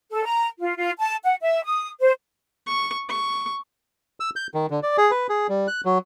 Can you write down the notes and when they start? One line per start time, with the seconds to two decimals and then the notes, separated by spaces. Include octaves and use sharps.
0.11 A4
0.24 A#5
0.59 F4
0.77 F4
0.98 A5
1.23 F#5
1.41 E5
1.64 D#6
2.00 C5
2.67 C#6
3.09 C#6
4.20 E6
4.36 G6
4.54 D#3
4.70 D3
4.83 D5
4.98 G#4
5.11 B4
5.29 G#4
5.49 G3
5.68 F#6
5.85 F#3